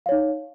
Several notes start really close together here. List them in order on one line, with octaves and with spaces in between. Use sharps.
F5 C#5 D#4